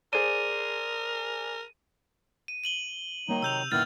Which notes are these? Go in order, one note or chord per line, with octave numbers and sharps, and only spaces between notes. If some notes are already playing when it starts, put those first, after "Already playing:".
G#4 A#4 C5 D5 D#7
D#7
D#7 F#7 G7
D#3 F#3 G3 A#3 D#4
C3 E6 G6 F7
F#1 A#2 D3 D#3 B3 E4 F6 A6